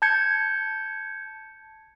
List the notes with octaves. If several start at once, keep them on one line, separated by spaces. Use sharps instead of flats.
A5 G6 G#6 C#7